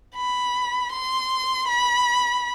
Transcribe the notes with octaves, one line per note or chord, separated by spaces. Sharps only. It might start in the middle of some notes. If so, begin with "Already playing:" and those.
B5
C6
B5